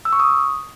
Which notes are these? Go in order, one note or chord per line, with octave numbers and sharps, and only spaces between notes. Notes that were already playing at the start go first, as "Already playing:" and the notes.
E6
C#6
D#6